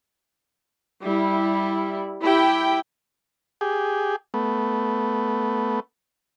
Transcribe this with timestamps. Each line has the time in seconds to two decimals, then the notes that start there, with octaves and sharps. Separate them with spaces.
1.01 G3 E4
2.22 E4 G4 G5
3.61 G4 G#4
4.34 A3 B3